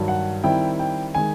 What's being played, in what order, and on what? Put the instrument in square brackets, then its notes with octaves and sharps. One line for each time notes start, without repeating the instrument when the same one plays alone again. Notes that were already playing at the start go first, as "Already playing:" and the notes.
Already playing: [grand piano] G2 D#3 F#3
F#5
D#3 G3 C4 E4 G5
G5
D#3 G#3 G#5